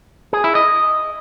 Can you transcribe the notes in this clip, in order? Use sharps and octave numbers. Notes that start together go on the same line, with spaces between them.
G#4
E4
D#5